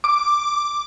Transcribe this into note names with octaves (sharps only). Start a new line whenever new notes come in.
D6